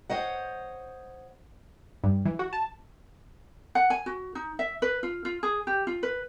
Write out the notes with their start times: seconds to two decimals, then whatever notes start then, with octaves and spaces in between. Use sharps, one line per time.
0.09 C5 C#5 D#5 F#5
2.03 G2
2.25 E3
2.39 F#4
2.53 A5
3.75 F#5
3.90 G#5
4.06 F#4
4.35 D#4
4.59 E5
4.82 B4
5.03 F4
5.25 F4
5.43 G#4
5.67 G4
5.87 F4
6.03 B4